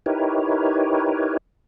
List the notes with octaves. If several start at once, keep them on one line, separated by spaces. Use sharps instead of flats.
D#4 E4 G4 A#4 B4 C#5